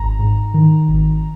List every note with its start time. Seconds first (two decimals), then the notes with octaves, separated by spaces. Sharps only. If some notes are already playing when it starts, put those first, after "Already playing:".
Already playing: G#1 A#5
0.19 G#2
0.54 D#3
0.89 G#1